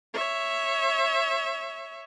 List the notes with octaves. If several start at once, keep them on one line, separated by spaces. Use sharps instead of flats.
C#5 E5